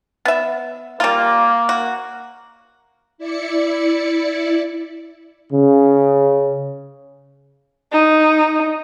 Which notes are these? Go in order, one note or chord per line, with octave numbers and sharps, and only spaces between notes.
B3 E5
G3 A#3 F4
F#4
E4 D5 C#7
C#3
D#4